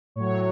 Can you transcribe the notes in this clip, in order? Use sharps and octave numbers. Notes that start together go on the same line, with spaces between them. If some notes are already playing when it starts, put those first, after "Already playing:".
A2 F#3 C#5